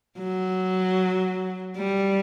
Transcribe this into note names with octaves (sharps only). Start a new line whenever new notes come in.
F#3
G3